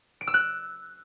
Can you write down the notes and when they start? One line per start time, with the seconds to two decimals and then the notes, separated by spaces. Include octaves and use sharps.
0.21 D7
0.27 E6
0.34 F#6